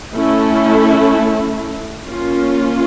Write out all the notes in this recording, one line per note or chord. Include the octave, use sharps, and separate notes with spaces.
A3 C#4 E4 A4
A#3 C#4 F4